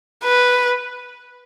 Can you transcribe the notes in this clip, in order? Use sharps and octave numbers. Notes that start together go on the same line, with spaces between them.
B4